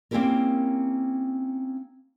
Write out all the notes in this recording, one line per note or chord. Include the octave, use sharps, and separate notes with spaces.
A#3 C4 C#4 E4 G4 A#4